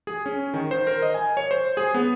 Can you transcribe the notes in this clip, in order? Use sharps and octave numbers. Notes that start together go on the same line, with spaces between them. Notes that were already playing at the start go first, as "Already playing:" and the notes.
G#4
C#4
D#3
C5
A#4
D#5
G#5
C#5
C5
G#4
B3